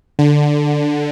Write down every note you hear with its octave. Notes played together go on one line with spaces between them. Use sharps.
D3